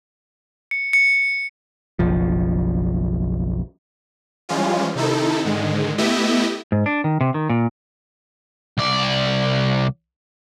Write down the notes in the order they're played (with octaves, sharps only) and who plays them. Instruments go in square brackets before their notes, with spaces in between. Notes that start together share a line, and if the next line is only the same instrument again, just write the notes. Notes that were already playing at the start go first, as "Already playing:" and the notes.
[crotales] C#7
C#7
[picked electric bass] F#1 B1 F3
[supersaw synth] E3 F3 G3 G#3 C#4 F4
C3 D#3 D#4 E4 A4
G#2 D3 D#3 G#3
A3 B3 E4 G4 D#5 E5
[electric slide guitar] G#2
D4
D#3
C3
D#3
A#2
[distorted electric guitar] C2 D5